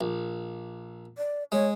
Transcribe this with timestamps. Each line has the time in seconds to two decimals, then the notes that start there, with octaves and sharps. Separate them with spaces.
0.01 A#1
1.18 D5
1.52 G#3 C#5